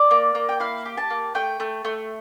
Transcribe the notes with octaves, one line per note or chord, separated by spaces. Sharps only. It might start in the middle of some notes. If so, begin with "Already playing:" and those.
Already playing: D5
A#3
A#3
G5
E4 F5
G4
A5
A#3
A3 G5
A3
A3